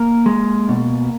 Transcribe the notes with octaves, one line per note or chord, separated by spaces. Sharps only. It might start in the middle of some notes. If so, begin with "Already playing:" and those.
Already playing: A#3 A#4
G#3
B2